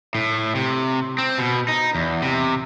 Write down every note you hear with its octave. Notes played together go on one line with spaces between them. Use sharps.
A2
C3
C4
B2
D#4
E2
C3